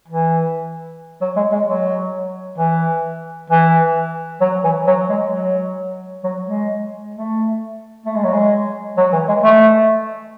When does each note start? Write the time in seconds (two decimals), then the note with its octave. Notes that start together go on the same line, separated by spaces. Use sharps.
0.08 E3
1.21 F#3
1.36 G#3
1.52 G#3
1.67 F#3
2.58 E3
3.50 E3
4.41 F#3
4.64 E3
4.87 F#3
5.10 G#3
5.33 F#3
6.24 F#3
6.47 G#3
7.15 A3
8.06 A3
8.15 G#3
8.24 F#3
8.33 G#3
8.97 F#3
9.13 E3
9.29 G#3
9.43 A3